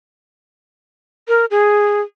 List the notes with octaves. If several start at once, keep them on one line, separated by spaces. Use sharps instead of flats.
A#4
G#4